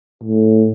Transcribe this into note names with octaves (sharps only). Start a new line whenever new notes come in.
A2